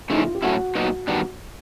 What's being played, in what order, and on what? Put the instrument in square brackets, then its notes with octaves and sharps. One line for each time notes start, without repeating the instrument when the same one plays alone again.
[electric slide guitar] C#3 F3 A3 [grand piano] D#4
[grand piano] E4
F4
G4
[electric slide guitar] A2 F#3 A3 C#4 E4 [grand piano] F#4
[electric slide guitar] A#2 F#3 B3 D#4
[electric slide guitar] D#3 G3 B3 D4 [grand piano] F#4